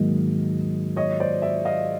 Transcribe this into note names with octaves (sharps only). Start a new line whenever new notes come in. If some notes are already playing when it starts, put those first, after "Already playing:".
Already playing: G#2 D#3 F#3 A#3 D#5
C#5 D#5
C5 D5
D5 E5
D#5 F5